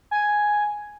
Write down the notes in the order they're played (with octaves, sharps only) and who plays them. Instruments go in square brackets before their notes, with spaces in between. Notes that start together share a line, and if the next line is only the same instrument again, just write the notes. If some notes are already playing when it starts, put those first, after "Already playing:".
[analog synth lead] G#5